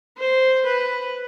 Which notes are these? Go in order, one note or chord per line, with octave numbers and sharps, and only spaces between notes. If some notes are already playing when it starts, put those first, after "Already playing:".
C5
B4